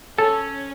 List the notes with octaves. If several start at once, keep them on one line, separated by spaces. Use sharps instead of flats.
C#4 A4